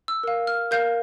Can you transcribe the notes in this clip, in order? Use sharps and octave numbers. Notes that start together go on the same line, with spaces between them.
E6
A#4 F5
F6
A#4 F5 G6